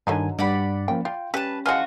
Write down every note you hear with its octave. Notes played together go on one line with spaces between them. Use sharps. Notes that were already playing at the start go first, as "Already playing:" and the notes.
G2 D3 D#3 F#3 D#4 G#5
G2 G3 D5 F#5 B5
F3 A#3 C#4 G5
F4 G5
G3 C#4 B4 A5
E3 F3 G#3 F4 F#4